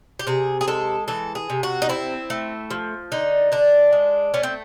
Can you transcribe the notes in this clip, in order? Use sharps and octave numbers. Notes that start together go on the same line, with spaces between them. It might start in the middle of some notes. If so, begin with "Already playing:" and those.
G4
C3 G#4
G#4
G#3 A4
E3 A4
G#4
C3
F#4
D#4
C4 E4
A3
F3
D3 D#4
D3 D4
G#3
A3 C#4
C4